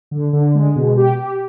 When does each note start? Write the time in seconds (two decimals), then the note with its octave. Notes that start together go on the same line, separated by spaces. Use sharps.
0.11 D3
0.33 D3
0.55 G#3
0.76 B2
0.97 G4
1.18 G4